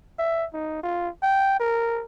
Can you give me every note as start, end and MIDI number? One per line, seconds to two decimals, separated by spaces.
0.19 0.45 76
0.53 0.78 63
0.83 1.09 65
1.22 1.56 79
1.60 2.04 70